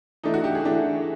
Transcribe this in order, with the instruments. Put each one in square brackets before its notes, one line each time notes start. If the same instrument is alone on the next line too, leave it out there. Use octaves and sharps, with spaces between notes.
[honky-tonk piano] E3 A3 D4 [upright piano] D#4
[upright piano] F#4
G4
G#4
[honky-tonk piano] E3 A3 D4 [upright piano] G4